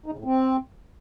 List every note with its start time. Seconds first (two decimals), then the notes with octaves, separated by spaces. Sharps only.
0.06 D#4
0.12 C#3
0.19 A2
0.25 C4